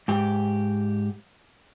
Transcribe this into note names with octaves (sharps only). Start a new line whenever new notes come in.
G#2 G4